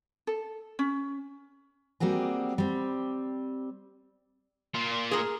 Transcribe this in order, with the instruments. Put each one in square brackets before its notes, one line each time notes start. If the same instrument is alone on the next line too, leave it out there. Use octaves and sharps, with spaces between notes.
[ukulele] A4
C#4
[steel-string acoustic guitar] G3 A#3 C4 F#4 G#4
G3 C4
[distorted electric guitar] A#2 F4
[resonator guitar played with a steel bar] G#4 A#4